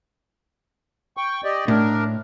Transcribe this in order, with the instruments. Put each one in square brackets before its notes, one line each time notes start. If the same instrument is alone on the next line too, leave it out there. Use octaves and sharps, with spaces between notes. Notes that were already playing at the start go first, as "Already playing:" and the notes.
[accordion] G5 C#6
G4 D5 D#5
[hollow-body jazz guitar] A2 [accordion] D4 A#4